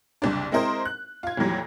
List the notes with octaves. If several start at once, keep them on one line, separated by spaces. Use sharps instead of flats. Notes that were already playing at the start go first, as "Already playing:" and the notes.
F#1 C2 D4
G#3 C4 E4 A#4 C5 D#5
F#6
F4 G#6
F2 A#2 E3 F#3 G3